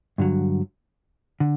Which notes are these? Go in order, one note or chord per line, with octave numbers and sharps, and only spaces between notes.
G2 D3 F#3
D3